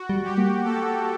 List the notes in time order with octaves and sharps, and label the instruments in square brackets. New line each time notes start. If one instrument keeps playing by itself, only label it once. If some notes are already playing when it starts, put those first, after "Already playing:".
Already playing: [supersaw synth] F#4
[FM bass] G3
[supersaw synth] G4
[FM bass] A#3
[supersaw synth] A4